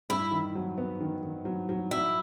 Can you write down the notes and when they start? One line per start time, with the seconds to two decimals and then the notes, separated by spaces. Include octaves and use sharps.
0.09 G2 E4
0.31 D#3
0.55 F#3
0.78 B3
1.01 D#3
1.23 D#3
1.45 F#3
1.69 F#3
1.91 F#3 E4